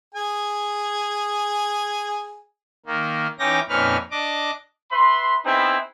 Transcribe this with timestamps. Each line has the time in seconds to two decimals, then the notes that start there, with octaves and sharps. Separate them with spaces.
0.14 G#4 G#5
2.86 D#3 A#3
3.39 E3 C#4 D#4 G5 D6 A#6
3.69 F2 A#2 C#4 D#4 B4 F6
4.11 D4 D#5 D6
4.91 B4 E5 B5 C6
5.45 B3 C4 D#4 E4 G#4 B4